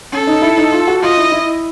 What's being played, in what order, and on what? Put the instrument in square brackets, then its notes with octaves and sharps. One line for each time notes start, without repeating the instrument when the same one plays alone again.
[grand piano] C#4 [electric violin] A4
[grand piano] D#4
E4
D#4
F4
F#4
[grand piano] F4 [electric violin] D#5
[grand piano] E4
E4